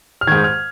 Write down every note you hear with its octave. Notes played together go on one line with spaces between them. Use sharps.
F6
G#2 D#3 G#6
F6